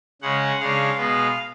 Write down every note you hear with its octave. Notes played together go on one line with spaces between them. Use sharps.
C#3 G#3 C#4 F#5
C#3 G#3 D4 F5
B2 G#3 B3